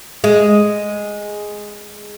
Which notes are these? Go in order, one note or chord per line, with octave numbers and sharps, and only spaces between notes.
G#3